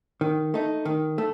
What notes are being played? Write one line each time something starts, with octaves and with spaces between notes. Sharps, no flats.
D#3
A3 D#4
D#3
A3